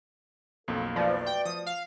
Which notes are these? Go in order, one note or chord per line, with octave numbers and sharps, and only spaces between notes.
B1 F2 A#3 A4 A#4
B2 F3 A3 D5
G5
F3 D#6
F5